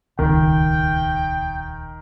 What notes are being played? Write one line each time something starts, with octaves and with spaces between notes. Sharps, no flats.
D#1 C#2 D#3 G5